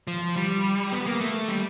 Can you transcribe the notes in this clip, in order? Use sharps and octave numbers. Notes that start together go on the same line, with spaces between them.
F3
G3
B3
A#3
A3
G3